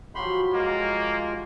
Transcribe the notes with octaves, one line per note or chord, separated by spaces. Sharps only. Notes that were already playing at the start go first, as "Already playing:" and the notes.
F3 F#3 G4 B5 C6
G#3 A#3 F4